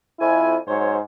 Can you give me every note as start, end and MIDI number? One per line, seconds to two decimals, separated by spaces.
0.20 0.55 41
0.20 0.57 64
0.20 0.55 80
0.67 1.00 44
0.67 0.96 54
0.67 0.96 72
0.67 0.96 73